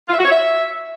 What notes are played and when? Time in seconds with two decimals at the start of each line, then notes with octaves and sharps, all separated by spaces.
0.08 F4
0.13 E5
0.19 F#4
0.24 C#5
0.30 E5